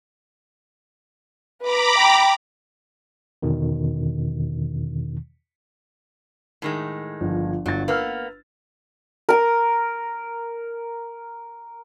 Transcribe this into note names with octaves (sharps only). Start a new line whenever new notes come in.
B4 A#5 B5 D6
G5
E2 B2 D3 D#3
A2 D#3 G#3
G1 F3
G1 F#3 A6
A#3 B3 B4 E6 F6
A#4 A#5